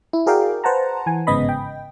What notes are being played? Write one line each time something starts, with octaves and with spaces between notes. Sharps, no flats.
E4
F#4 G#4 A#4 D5 F5 G5
B4 C5 F#5 A5 A#5
E3 G#5
G1 G#2 C#3 B3 D#5 B5
G5